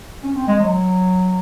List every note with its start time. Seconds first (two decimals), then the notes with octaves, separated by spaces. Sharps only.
0.24 C#4
0.36 C4
0.47 G#3
0.59 F#3